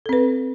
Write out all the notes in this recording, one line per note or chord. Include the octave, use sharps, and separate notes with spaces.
C4 A4 B4